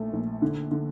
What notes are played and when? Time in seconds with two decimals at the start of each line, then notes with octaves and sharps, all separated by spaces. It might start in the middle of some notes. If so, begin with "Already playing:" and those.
Already playing: A#1 A3
0.13 A#1
0.42 D3
0.71 D3